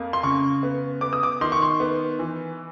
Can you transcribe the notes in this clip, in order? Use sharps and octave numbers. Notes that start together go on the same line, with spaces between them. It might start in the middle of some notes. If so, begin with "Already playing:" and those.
Already playing: F2 A#3
C6
C#3 C#6
B3
B3 D6
D#6
D6
D#3 C6
C#6
C6
B3
E3